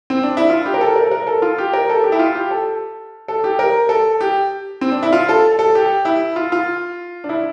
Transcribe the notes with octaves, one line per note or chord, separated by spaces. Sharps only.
C4
D4
E4
F4
G4
A#4
A4
A#4
A#4
A4
F4
G4
A#4
A4
G4
E4
F4
G4
A4
A4
G4
A#4
A4
G4
C4
D4
E4
F4
A4
A4
G4
E4
F4
F4
D4
E4